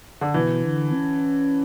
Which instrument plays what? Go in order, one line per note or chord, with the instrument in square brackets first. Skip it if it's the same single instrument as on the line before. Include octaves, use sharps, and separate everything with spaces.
[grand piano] D3
[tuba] B2 [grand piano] E3
[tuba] D3
C#4